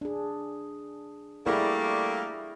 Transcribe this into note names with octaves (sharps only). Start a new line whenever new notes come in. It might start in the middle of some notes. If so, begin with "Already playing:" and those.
D4 G#4
G3 A3 A#3 E4 G#4 D5